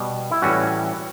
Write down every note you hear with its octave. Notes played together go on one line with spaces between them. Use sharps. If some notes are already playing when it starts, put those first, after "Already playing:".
Already playing: B2 G3 B3
E4
A2 E3 G3 C#4 F#4